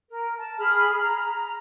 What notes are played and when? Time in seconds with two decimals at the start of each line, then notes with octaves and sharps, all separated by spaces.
0.10 A#4
0.37 A5
0.58 G#4 B5 F6
1.00 A#5